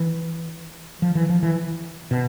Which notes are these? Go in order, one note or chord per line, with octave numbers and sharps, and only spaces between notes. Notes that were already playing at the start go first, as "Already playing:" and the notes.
Already playing: E3
F3
E3
F3
E3
B2